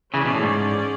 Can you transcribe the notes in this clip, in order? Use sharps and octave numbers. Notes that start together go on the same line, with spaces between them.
C#3 E3 C#4 G#4 D5
B2
A2
G#2